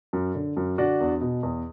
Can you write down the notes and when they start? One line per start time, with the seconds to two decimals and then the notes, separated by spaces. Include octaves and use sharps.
0.13 F#2
0.35 D3
0.57 F#2
0.78 D3 D4 F#4
1.01 E2
1.21 B2
1.43 E2